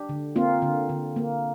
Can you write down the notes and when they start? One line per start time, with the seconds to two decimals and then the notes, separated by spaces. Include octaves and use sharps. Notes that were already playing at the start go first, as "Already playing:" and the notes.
Already playing: D4 G4
0.09 D3
0.36 A#3 C4 F4
0.62 D3
0.89 D3
1.16 A#3